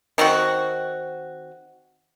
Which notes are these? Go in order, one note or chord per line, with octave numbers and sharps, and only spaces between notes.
D#3 C4 F#4 F#5